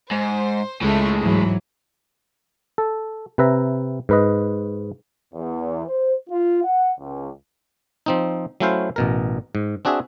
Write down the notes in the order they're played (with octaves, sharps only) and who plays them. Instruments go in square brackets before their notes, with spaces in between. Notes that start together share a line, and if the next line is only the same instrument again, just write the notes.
[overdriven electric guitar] G#2 [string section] C5
[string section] C#2 A3 [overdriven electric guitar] A2 G#3
[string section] G#2 E3 F#3
[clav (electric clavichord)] A4
C3 B4 E5 A#5
G#2 B4 D#5
[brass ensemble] E2
C5
F4
F#5
C#2
[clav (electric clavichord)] F3 C4 D#4
F#3 A3 C#4 E4 C5 F5
A1 B2 A#4
G#2
C4 D4 F#4 G#4 E5